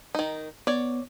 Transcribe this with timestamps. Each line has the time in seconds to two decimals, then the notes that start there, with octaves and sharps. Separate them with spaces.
0.15 D#3 D#4
0.67 B3 C#5 D5